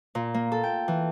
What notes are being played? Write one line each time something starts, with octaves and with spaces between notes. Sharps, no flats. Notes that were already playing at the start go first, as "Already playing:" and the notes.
A#2
A#3
A4
G5
E3